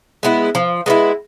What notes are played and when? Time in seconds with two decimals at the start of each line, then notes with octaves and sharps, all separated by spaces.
0.23 G#3 B3 E4
0.55 F3
0.86 G#3 B3 E4